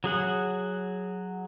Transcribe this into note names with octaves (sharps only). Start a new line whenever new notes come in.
F#3 G#4 F#5